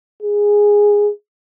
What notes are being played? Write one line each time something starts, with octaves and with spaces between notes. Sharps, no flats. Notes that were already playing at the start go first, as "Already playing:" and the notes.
G#4